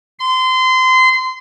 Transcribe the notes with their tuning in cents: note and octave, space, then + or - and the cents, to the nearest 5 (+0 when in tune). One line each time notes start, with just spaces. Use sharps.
C6 -25